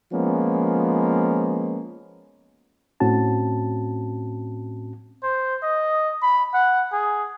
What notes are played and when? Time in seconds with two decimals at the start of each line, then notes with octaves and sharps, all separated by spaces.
0.12 F3 G#3 A#3 B3 C#4
3.00 A2 C4 C#4 F#4 A5
5.23 C5
5.62 D#5
6.22 B5
6.54 F#5
6.92 G#4